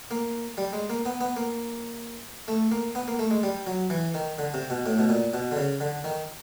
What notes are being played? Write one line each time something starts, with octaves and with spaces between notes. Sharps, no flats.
A#3
G3
G#3
A#3
B3
B3
A#3
A3
A#3
B3
A#3
A3
G#3
G3
F#3
E3
D#3
D3
C3
B2
A2
B2
A#2
B2
D3
C#3
D3
D#3